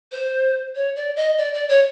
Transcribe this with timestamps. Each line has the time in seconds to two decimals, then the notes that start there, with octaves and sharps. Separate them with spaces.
0.12 C5
0.75 C#5
0.96 D5
1.16 D#5
1.38 D5
1.54 D5
1.69 C#5